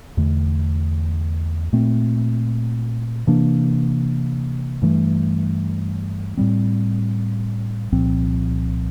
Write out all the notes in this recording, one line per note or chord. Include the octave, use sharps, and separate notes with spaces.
E2 D3 A3
A#2 A3 C4
C3 E3 A#3 D4
G2 E3 A3
A2 G3 C4
C2 A#2 F3 C4